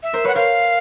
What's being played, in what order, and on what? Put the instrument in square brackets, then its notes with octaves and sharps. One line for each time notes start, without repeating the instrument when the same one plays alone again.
[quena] E5
[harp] A#4 C5
[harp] B4 C#5 [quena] F#5
[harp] A#4 C5 [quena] F5